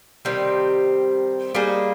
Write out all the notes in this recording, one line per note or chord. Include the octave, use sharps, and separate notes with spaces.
C3 D#3 G3 C4
G3 A#3 D#4 G#4